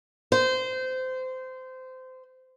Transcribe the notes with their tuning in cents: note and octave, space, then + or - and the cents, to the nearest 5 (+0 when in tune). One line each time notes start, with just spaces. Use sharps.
C5 -20